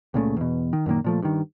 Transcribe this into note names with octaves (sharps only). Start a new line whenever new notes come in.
C#2 A#2 C#3 A3
E2 B2
D#3
F#2 A#2 D#3 A#3
A#2 F3 A3
G2 D#3